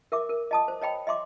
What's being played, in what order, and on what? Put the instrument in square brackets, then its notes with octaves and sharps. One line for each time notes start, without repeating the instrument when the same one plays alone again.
[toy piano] A#4 E5 D6
A#4
D#5 A5 D#6
C5
C#5 D#5 G5 B5
D#5 E5 C6 D6